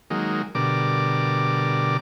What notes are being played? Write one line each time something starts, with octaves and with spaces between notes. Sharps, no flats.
D#3 F#3 G#3 A#3
B2 D3 G3 A#4 D5 D6